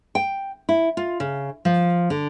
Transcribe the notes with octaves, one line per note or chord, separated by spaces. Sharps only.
G5
E4
F4
C#3
F3
D3